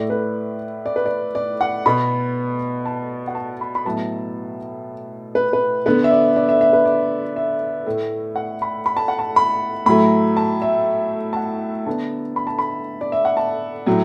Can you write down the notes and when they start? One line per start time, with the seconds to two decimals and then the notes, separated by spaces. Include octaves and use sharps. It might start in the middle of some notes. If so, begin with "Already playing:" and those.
Already playing: A2 A3 D5
0.10 B4
0.86 D5
0.96 B4
1.06 D5
1.35 D5
1.61 F#5
1.86 B2 B3 B5
2.86 A5
3.28 F#5
3.35 A5
3.61 B5
3.75 B5
3.85 A2 F#3 B3 A5
5.35 B4
5.53 B4
5.86 D3 B3 B4
6.04 E5
6.11 D5
6.36 D5
6.49 E5
6.61 E5
6.73 B4
6.85 D5
7.36 E5
7.86 A2 A3
8.36 F#5
8.62 B5
8.86 B5
8.97 A5
9.08 F#5
9.19 A5
9.36 B5
9.86 A2 F#3 A3 B5
10.37 A5
10.62 E5
11.33 A5
11.36 F#5
11.86 D3 B3 A5
12.36 B5
12.47 A5
12.59 B5
13.01 D5
13.12 E5
13.25 F#5
13.37 A5
13.86 A2 F#3 A3